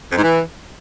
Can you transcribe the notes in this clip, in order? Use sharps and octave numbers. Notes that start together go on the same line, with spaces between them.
F2
G#2
E3